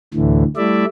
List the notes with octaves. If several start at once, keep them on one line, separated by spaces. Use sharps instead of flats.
D2 A2 D3 E3
G3 A3 E4 D5 E5